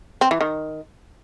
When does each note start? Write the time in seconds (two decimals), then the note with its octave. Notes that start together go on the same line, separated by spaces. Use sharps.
0.21 C4
0.31 E3
0.41 D#3